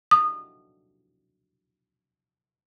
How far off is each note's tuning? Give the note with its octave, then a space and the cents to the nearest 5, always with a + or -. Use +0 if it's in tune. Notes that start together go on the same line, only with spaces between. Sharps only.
D#6 -25